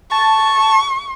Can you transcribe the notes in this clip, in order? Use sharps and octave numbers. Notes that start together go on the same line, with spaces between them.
A5 C#6